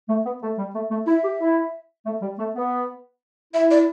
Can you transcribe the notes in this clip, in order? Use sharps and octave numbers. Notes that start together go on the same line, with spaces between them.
A3
B3
A3
G3
A3
A3
E4 E5
G4
E4
A3
G3
A3
B3
E4 E5
D5